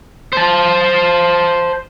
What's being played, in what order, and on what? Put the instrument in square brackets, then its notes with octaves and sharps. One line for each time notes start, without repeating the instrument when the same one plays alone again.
[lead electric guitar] C5 A5